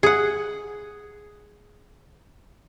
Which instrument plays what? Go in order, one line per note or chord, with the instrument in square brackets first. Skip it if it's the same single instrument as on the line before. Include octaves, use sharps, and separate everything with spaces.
[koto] G#4 F#5